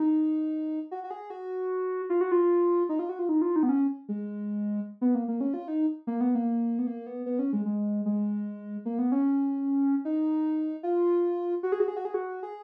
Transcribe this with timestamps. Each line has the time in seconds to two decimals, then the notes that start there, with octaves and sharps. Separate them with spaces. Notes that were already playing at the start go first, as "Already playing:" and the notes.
Already playing: D#4
0.91 F#4
1.04 F#4
1.11 G#4
1.30 F#4
2.10 F4
2.21 F#4
2.32 F4
2.89 D#4
2.99 F4
3.09 F#4
3.19 F4
3.29 D#4
3.42 F4
3.56 D#4
3.63 B3
3.69 C#4
4.09 G#3
5.01 B3
5.15 A#3
5.28 A#3
5.41 C#4
5.54 F4
5.68 D#4
6.07 A#3
6.21 B3
6.35 A#3
6.79 B3
6.87 A#3
7.07 B3
7.26 B3
7.39 C#4
7.53 G#3
7.65 G#3
8.06 G#3
8.85 A#3
8.99 B3
9.12 C#4
10.05 D#4
10.83 F4
11.63 F#4
11.72 G#4
11.80 F#4
11.88 G#4
11.97 F#4
12.05 G#4
12.14 F#4
12.43 G#4